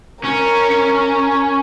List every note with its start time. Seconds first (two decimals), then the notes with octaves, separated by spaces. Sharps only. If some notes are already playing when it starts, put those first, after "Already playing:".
0.25 C#4 A#4